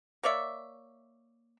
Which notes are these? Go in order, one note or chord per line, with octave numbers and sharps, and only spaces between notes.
A#3 C#5 D5 E5